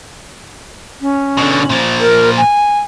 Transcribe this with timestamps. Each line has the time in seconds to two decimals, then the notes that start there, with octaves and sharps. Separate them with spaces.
1.01 C#4
1.37 B2 D3
1.69 A#2 F3
2.00 A#4
2.37 G#5